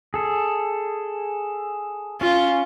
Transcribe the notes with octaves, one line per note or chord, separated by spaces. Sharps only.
G#4 A4
C#4 F4